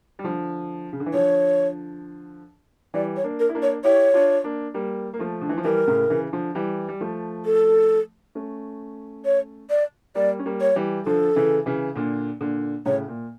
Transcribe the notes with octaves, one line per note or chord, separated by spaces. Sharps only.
G3
D3 F3
C#3
D3
E3
D3 F3 C#5
E3 G3 D5
C#5
A#3 D4
A#4
E4
A#3 D4
C#5
E4 G4 C#5
D4 F4
A#3 D4
G3 A#3
A#3
F3 A3
D3
E3
F3
E3 G3 A#4
A2 C#3
C#3 E3
D3 F3
E3 G3
G3
F3 A3
A4
A3 C#4
C#5
D5
G3 A#3 D5
C#4
G3 A#3
C#5
E3 G3
D3 F3 A4
C#3 E3
C#3 E3
A#2 D3
A#2 D3
A2 C#3 C#5
A#2